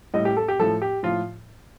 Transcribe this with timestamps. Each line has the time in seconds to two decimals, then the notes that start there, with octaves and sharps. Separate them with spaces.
0.14 A2 G3 D#5
0.25 G4
0.37 A4
0.48 G4
0.59 A2 F3 A4
0.82 G4
1.03 A2 F3 F4